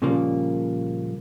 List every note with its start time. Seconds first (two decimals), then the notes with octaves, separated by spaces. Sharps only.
0.02 A#2 C#3 F3 G3 A#3